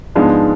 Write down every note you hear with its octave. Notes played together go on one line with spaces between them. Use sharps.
G#2 F3 G#3 B3 D4